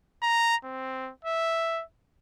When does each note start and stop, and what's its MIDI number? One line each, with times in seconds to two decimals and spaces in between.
0.23 0.56 82
0.64 1.10 60
1.25 1.82 76